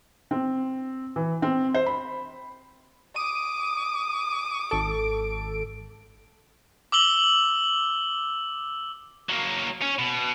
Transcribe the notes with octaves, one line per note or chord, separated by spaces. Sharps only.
C4
E3
C4
C5
B5
D6 D#6 D#7
G#1 A4 D7
D6 E6 F#7 G7
F#3 A#3
C#4
B2